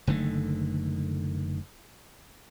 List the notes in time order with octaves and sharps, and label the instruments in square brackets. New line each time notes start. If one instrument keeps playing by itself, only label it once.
[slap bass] F#1 D3 D#3 A3